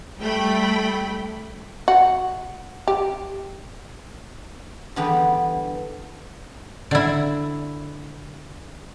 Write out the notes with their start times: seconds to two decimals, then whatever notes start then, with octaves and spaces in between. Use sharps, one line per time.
0.19 G3 A3 G5 B5
1.88 F#4
2.88 G4
4.96 D3 E3 G3 B3 G4
6.91 D3 E4